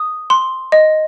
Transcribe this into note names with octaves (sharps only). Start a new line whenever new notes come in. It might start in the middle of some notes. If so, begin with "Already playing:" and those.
Already playing: D#6
C6
D#5